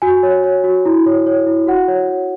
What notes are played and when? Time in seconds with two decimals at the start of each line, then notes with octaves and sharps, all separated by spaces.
0.02 F#4 G#5
0.23 C#5
0.44 C#5
0.64 F#4
0.86 E4
1.06 C#5
1.27 C#5
1.47 E4
1.67 F#4 F#5
1.88 C#5
2.09 C#5